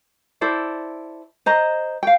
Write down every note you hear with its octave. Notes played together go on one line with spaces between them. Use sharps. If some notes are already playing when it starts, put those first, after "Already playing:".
E4 A4 C5 D5
C5 D#5 A#5
F5 G5